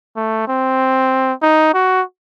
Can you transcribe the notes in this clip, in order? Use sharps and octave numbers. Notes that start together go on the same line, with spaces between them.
A3
C4
D#4
F#4